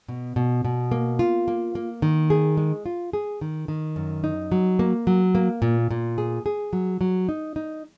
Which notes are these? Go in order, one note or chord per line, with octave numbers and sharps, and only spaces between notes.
B2
B2
B2
A#3
F4
A#3
A#3
D#3
G#4
G#3
F4
G#4
D#3
D#3
F#2
D#4
F#3
A#3
F#3
A#3
A#2
A#2
G#4
G#4
F#3
F#3
D#4
D#4